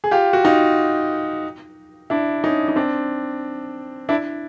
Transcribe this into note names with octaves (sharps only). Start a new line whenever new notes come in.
G#4
F4 G4
F#4
D#4 F4
D4 E4
C#4 D#4
D#4
C4 D4
D4 E4